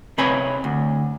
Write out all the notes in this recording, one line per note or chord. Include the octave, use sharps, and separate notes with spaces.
C3 C4 B4 C#5 G#5 B5
D2